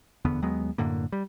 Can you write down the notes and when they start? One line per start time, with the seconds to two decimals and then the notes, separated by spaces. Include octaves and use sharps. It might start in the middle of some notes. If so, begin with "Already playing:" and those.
0.25 F1 E2 D3 B3
0.42 D#2 F#3 G#3 B3
0.78 F#2 A2 D3 A#3
1.12 G3